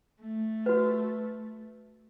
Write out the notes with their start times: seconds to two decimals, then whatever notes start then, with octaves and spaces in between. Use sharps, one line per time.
0.19 A3
0.66 F#4 B4